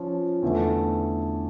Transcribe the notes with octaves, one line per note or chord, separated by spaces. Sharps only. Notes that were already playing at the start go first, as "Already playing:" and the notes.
Already playing: F3 C#4 F4
E2 D3 A3